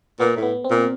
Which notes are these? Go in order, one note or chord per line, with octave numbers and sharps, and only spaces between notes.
A#2 B3
A2
B3
C4
A#2